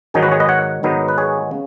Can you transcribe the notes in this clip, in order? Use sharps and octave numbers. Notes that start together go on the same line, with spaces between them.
G#2 D#3 F#3 D#4 G#4
F#4 B4
G#4 C#5
B4 D#5
C#5 F#5
G#2 D#3 F#3 B3 D#4
B4
G#4 C#5
C#3